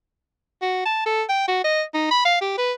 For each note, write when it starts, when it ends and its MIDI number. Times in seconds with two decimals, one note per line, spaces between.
0.62 0.82 66
0.86 1.03 81
1.06 1.23 69
1.29 1.46 79
1.48 1.62 66
1.64 1.83 75
1.94 2.09 63
2.11 2.25 83
2.25 2.37 77
2.41 2.54 67
2.58 2.73 71